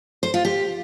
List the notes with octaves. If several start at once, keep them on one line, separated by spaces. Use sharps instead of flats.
C5
F4
G4